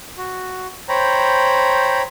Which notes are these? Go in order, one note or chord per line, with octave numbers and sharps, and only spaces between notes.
F#4
C5 C#5 G5 A#5 B5